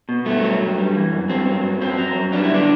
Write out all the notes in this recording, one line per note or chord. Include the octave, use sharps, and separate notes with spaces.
B2
G2 A3
F#3
G2
G3
E3
F#2
G2 C4
F#3
G2
F#2 C4
F#3
F#2
G3 D4
E4
D3 D4